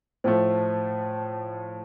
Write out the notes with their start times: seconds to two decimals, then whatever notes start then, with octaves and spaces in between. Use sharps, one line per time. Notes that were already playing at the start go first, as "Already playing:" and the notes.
0.24 A2 F3 A3 C5